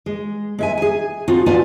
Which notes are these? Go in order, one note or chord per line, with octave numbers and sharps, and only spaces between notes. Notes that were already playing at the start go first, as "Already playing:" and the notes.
G#3
G#3 E5 G#5
G#4 G#5
F3 C4 F4 F#4
B3 F4 F#4 D5 G#5 A5